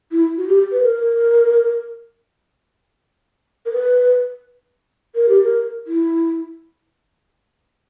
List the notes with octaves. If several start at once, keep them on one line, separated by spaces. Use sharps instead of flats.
E4
F#4
G4
B4
A#4
A#4
B4
A#4
G4
A#4
E4